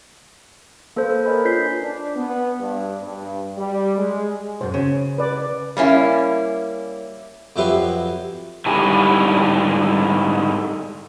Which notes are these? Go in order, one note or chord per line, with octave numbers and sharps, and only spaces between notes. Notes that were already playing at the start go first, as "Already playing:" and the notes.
A#3 A4 B4 C5
A4
A#4 B4 C#5 D#5 G#5 B5
D4 F4 D#5 G6 B6 C7
D4
B3
G2
G2
G3
G#3
B1 F#2 C5
C#3
B4 D5
G3 A#3 C#4 E4
F2 F#3 E4 G4 B4 C6
G#2 D3 G3 E4 F#4 G#5